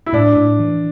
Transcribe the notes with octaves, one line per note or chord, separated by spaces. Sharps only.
E4
A2 D4
A2
E3